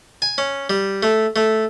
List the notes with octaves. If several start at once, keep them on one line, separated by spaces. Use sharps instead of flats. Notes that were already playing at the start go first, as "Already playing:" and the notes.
G#5
C#4
G3
A3
A3